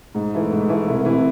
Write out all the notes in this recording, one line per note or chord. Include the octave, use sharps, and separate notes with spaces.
G#2
E3 A3
G#2
E3 A3
C2
C3 E3